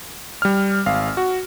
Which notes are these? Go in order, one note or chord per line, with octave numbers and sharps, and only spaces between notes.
G3 F6
G#1 F5
F#4